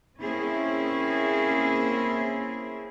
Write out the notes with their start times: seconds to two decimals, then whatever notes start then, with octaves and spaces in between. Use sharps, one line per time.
0.21 A#3 C4 C#4 E4 G#4